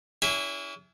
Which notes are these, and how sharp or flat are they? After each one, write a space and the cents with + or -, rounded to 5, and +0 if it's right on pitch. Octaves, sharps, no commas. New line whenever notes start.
C#4 +35 E4 +0 G#4 -30